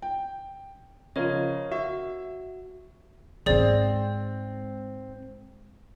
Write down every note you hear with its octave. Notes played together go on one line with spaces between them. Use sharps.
G5
C#3 F3 A#4 C#5 D#5
F#4 E5
G#2 G#3 C4 G#4 D5